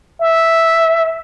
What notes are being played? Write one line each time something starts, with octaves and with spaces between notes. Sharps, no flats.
E5